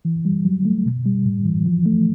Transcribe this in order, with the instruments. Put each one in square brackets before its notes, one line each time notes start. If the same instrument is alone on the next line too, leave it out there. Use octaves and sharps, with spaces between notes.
[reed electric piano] E3
G3
F#3
A3
B2
G3
A2
E3
F3
A3